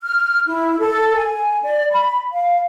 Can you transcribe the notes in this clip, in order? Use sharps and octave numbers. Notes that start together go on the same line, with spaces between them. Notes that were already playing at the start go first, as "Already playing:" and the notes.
F6
E4
A4
G#5
D5
B5
F5